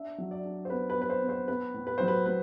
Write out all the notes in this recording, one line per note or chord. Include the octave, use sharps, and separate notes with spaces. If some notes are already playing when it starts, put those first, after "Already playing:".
Already playing: D4 E5
F#3
D5
D4
C5
B3 B4
B4
B3
B4
C5
B3
C5
B3 B4
A2
B4
F#3 C5
B4
A2 B4